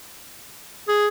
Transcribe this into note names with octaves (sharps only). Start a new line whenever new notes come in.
G#4